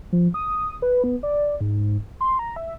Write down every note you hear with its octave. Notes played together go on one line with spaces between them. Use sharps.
F3
D#6
B4
B3
D5
G#2
C6
A#5
E5